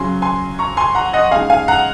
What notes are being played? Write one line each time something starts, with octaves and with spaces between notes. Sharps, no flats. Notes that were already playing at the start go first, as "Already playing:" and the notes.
Already playing: C#3 F#3 C#4 G#5 C6
G#5 C6
A#5 C#6
G#5 C6
F#5 A#5
D#5 F#5
C#3 G#3 D#4 F5 G#5
F5 G#5
F#5 A#5